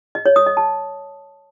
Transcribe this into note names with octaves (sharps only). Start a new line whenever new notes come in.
D#5
C#5
D#6
D#5
A5